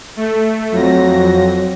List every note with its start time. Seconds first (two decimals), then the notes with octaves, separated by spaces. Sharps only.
0.17 A3
0.72 F2 F#3 A#6